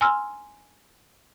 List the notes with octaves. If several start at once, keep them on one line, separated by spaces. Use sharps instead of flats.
G#5 A#5 C6 E6 F6